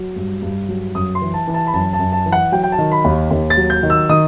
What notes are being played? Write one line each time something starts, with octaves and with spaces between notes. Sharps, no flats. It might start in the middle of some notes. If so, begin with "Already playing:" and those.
Already playing: F#3
G2
G2
F#3
F#2 D#6
C6
E3
A5
E3
A5
B5
F#2 A5
A5
F#2
A5
E3
F#5
F#3 G5
G5
A5
D#3
B5
D#2
D#2
A6
F#3
G6
D#3
E6
D#3 D#6